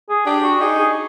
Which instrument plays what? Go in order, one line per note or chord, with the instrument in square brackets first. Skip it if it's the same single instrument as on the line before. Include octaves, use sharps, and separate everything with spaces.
[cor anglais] G#4
[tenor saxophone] D4 [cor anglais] G4
[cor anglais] F#4
[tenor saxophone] D#4 [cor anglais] G#4
[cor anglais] G#4